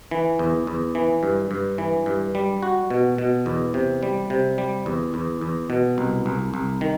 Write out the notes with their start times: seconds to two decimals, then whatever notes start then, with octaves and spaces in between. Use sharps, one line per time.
0.11 E3
0.39 E2
0.67 E2
0.95 E3
1.23 G2
1.51 G2
1.78 E3
2.06 G2
2.35 G3
2.63 F#4
2.90 B2
3.18 B2
3.46 E2
3.74 C3
4.03 G3
4.30 C3
4.58 G3
4.86 E2
5.14 E2
5.41 E2
5.70 B2
5.98 C2
6.26 C2
6.54 C2
6.81 D#3